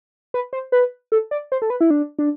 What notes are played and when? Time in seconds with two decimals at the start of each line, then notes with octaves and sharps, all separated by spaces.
0.34 B4
0.53 C5
0.72 B4
1.12 A4
1.31 D5
1.52 C5
1.62 A4
1.70 B4
1.81 E4
1.90 D4
2.19 D4